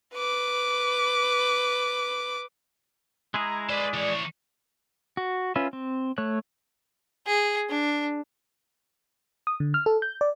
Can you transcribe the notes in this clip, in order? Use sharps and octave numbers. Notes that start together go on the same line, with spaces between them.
B4 D6
G#3 E4 G#4 A#5
B4 C5 D5
E3 C#5
F#4
C#4 F4 B4 E5
C4
A3 C#5 F#6
G#4
D4
D#6
D3
F6
A4
G6
D5